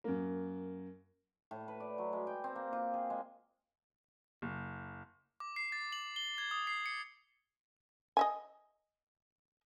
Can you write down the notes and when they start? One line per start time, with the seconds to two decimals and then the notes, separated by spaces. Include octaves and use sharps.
0.04 F#2 A#3
1.51 A2
1.68 B4
1.80 D5
1.98 F#3
2.13 G#3
2.27 G5
2.44 C4
2.55 A#3
2.73 F4
2.94 G#4
3.10 G#3
4.42 F#1
5.40 D6
5.56 C7
5.72 A6
5.92 F#7
6.16 G7
6.38 G#6
6.51 D#6
6.67 C7
6.86 C#7
8.17 D#5 E5 G#5